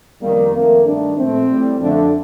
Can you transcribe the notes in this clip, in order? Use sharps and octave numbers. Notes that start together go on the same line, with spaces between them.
F2 D#3 G3 A#3
F2 D#3 A3 A#3
G2 D#3 A3 D4
A#2 F3 A3 C4
A2 G3
F2 D3 A3 D4